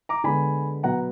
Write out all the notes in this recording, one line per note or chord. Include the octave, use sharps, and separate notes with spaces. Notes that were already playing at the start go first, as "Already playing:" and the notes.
A#5 D6
D3 G#3 B3 G#5 B5
B2 F#3 B3 F#5 A#5